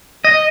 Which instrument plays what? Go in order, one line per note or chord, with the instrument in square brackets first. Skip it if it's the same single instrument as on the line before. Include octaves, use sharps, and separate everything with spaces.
[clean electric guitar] D#5